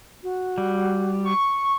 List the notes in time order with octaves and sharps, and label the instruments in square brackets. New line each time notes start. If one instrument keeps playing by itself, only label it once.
[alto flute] F#4
[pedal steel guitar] G3
[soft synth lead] C#6